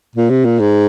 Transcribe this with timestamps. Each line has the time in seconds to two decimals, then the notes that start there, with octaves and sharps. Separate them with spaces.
0.16 A#2
0.30 C3
0.45 A#2
0.59 G#2